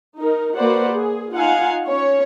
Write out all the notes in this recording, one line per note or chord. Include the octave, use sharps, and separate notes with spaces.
D#4 A#4
A#3 F#4 B4 C5 D5 F#5
G#4
D#4 F4 F5 F#5 G#5
C#4 C#5